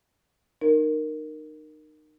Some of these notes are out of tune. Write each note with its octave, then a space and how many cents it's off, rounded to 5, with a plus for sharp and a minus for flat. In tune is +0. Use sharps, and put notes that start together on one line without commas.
D#4 -30 A#4 +0